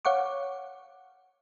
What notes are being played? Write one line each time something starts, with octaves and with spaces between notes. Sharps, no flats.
C#5 F5 F#5 C#6 D6